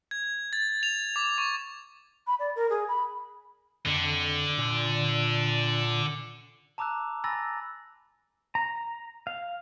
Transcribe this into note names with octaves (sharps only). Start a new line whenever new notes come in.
G#6
A6
F7
D6
C#6
B5
D5
A#4
G#4
B5
F2 D3
A#2
A5 A#5 D6 E6 F#6
G#5 A#5 B5 E6 A6 A#6
A#5
F5